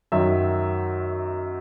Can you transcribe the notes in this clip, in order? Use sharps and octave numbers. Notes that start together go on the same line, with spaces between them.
F#2 D#3 F#3 E5